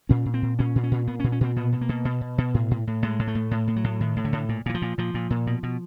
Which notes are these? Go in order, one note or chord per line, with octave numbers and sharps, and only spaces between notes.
A#2 C#4
A#2
C4
A#2
A#2 C#4
A#2
C#4
A#2
A#2 B3
C#4
A#2
C#4
A#2 C4
B2 B3
B2
A#3
B2
B2
B2
B2
A2
A2
A2
A2 G#3
A2
A3
A2
A2
A2
F#3
A2
A2 D#3
A2
D3
A2
A#2
A#2 E3
F3
A#2
A#2 F3
A#2
A#2
B2
B2